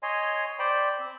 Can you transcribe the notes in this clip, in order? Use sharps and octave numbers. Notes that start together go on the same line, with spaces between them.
C#5 D#5 G#5 C6
C5 D5 G5 B5
C4